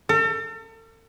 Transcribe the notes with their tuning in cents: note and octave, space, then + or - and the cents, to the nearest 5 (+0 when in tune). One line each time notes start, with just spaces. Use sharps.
A4 +40